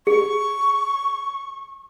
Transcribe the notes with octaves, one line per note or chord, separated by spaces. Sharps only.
G#4 C#6